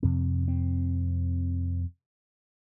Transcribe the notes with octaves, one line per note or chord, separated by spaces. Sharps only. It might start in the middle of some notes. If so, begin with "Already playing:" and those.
F2 C3 C4
C4